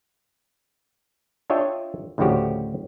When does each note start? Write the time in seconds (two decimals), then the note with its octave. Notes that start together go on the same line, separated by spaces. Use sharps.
1.50 D4 F4 C#5 D#5 E5 G5
2.18 D2 A2 C#3 F3 F#4 G4